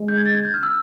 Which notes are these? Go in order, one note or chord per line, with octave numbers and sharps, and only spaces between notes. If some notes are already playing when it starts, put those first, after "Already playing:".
Already playing: G#3
G6
G#6
A6
G#6
G6
F6
E6